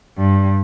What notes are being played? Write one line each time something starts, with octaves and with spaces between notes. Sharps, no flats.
G2